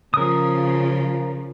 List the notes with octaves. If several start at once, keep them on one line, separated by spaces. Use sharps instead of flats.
C#3 F3 A#4 D#6